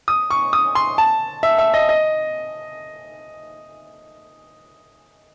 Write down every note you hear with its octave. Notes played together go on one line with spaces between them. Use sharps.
D#6
C#6
D#6
C6
A5
E5
E5
D#5
D#5